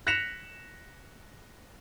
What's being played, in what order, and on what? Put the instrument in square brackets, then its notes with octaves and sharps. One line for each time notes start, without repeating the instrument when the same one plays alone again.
[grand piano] F#6 A#6 B6 C#7 E7 F7